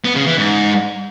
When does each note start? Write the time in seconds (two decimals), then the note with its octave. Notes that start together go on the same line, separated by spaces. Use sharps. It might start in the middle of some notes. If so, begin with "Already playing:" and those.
0.05 B3
0.16 C#3
0.26 E3
0.37 G#2